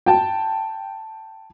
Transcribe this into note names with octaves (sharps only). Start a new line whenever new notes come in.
G5 A5